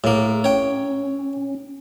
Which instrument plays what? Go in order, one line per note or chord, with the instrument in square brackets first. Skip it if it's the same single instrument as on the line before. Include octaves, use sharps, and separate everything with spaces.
[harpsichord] A2 A#3 [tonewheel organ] G#4
[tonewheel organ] C#4 [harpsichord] C#5 G5